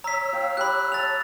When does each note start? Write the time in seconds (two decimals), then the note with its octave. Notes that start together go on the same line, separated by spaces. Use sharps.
0.04 C#5 A#5 E6 B6
0.33 F5 G5
0.57 G4 B5 F#6
0.92 A5 A6 F7